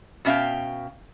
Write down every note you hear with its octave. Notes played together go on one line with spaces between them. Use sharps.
B2 C#4 E5 F5 G5